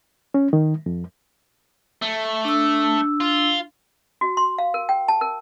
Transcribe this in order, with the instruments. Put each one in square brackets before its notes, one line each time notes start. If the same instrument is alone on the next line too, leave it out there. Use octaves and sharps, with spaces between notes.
[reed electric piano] C#4
D#3
F2
[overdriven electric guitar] A3
[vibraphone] D4 E6
[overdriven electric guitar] F4
[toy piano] F#4
C6
F5
A#4
G5
A5
A#4